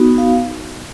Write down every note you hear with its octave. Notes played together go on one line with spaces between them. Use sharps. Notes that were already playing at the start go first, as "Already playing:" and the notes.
Already playing: B3 D#4 F#4
F5